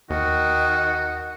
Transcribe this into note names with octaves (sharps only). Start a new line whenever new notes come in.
D#2 D#3 F#4